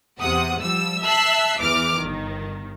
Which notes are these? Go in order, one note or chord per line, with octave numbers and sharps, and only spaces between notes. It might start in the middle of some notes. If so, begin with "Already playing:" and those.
E2 C3 F#5 D#6
F3 G3 E6
E5 A5 E6 F#6 B6 C7
E2 E3 D6 F6
G1 D#3